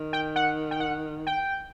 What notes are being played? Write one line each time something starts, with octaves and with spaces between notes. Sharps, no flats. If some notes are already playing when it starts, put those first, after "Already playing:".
Already playing: D#3
G5
F#5
G5
F#5
G5